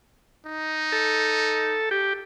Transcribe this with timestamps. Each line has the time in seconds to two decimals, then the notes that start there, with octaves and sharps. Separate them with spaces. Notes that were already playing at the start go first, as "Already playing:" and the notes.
0.46 D#4
0.92 A4
1.91 G4